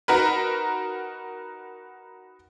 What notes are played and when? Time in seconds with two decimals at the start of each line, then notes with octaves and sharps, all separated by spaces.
0.08 D#4 F#4 A#4 B4